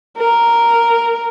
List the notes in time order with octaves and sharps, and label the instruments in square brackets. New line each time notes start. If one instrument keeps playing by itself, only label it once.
[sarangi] A#4